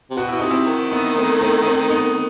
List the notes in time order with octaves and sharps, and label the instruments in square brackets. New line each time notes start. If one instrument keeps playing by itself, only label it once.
[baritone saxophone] C3
[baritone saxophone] B2 [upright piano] F#4
[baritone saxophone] B2 [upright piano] E4
[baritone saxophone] C3 [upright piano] D#4
[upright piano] C4 E4
[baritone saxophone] D#3
[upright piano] B3 D#4
A3 C4
A3 C4
A3 C4
B3 D#4